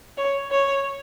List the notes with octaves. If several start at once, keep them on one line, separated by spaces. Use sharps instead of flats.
C#5
C#5